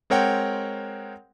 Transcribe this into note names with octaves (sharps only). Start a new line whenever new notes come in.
G#3 C4 A#4 C#5 F#5 G5